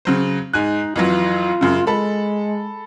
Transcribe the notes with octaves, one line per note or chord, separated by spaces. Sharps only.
C#3 F#3 C5
G#2 D#4 G#5 F#6
F2 E3 F#3 F4
F#2 C#3
G#3 A4 B5